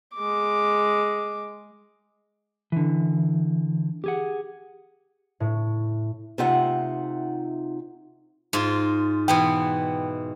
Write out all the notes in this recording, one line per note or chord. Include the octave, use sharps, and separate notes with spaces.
G#3 D6
D3 E3
G4 G#4 F#5
A2
C3 A3 D#4 F4 E5 F#5
G#2 F4
B2 E3 B3 G5